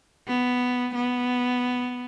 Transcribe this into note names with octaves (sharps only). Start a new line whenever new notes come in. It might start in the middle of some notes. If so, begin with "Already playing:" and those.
B3
B3